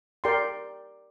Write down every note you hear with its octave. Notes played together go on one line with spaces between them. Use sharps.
G4 A#4 D5 G5 C6